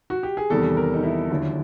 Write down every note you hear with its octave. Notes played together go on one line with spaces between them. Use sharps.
F#4
G4
G#4
E2 C3 D#3 G3 A4
A#4
D#4
E4
D#2 D3 F#3